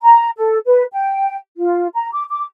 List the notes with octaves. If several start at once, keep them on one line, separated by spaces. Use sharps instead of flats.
A#5
A4
B4
G5
F4
A#5
D6
D6